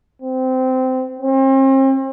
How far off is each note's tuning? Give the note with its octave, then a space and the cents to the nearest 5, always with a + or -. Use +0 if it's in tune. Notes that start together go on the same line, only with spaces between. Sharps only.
C4 -20
C4 +40